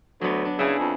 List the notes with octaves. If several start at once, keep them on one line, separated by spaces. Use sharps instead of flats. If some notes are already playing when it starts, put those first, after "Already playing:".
D2 F#3 B3
D4
C#3 E4 G#4 E5
F2